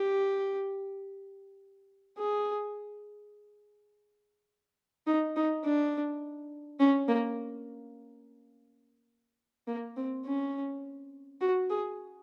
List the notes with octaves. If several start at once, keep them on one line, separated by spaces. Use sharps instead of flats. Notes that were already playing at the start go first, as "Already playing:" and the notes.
Already playing: G4
G#4
D#4
D#4
D4
C#4
A#3
A#3
C4
C#4
F#4
G#4